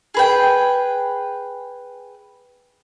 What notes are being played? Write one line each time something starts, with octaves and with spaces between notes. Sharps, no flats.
G#4 B4 G5